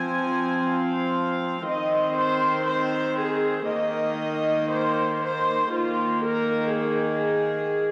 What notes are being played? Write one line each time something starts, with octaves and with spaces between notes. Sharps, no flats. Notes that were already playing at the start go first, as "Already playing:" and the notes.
Already playing: F3 C4 G#5
F5
D#3 C4 D#5
C5
C5
G#4
D#3 A#3 D#5
C5
C5
D#3 A#3 F4
A#4
G#4